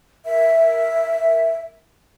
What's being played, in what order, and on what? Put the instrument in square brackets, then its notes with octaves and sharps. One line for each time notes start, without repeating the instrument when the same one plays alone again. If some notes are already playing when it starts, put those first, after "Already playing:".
[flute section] A#4 E5